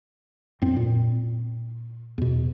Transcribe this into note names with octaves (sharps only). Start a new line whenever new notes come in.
F2 A2 C4
A#2
E2 B2